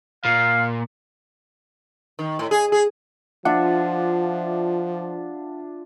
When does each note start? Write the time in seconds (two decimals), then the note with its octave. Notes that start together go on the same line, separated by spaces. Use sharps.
0.25 A#2 F5
2.19 D#3
2.39 A2
2.51 G#4
2.72 G#4
3.45 F3 D4 F4 E5 F#5